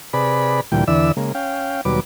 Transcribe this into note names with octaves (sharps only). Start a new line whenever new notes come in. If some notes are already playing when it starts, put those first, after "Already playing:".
C3 G#4 B4 D5 B5
D2 A#2 E3 G3 G5
E2 D3 E3 D5 E5 E6
C#3 G#3 A#3
C#4 F5 G5
D#2 B2 F#3 G3 B4 D6